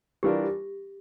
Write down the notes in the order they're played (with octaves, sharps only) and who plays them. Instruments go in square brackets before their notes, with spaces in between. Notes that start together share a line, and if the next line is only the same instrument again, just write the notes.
[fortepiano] E3 G3 D4 F4 A#4 [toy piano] G4